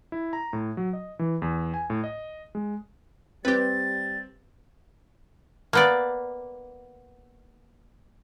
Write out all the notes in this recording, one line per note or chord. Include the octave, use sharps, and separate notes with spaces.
E4
A#5
A2
F#3
D#5
E3
E2
G#5
A2
D#5
G#3
G3 C4 G4 B4 A6
A#3 B3 D5